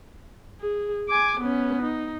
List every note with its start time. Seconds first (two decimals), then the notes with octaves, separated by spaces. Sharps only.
0.60 G#4
1.09 G#5 D6
1.41 B3 C#4
1.82 D#4